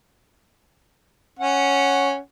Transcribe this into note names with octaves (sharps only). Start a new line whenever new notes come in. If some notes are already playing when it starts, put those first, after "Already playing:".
C#4 F#5